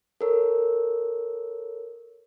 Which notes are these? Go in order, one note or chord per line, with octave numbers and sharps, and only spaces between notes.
A4 A#4 C#5